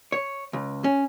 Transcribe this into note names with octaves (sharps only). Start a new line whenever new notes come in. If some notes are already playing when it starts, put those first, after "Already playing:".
C#5
C#2
C#4